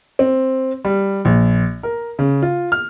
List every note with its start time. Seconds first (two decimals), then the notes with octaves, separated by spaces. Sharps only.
0.19 C4
0.85 G3
1.25 A#1
1.83 A#4
2.19 C#3
2.43 F4
2.72 F6